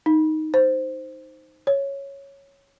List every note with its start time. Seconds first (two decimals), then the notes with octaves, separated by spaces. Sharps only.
0.06 D#4
0.54 C5
1.67 C#5